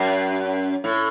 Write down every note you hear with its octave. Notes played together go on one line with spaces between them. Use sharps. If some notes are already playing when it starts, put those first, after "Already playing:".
Already playing: F#2
A2